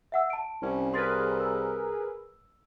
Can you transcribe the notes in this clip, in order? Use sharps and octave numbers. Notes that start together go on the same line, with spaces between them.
E5 F#5 E6
A5 D7
C2 C#4
G#4 A#4 B4 C6 A6
E6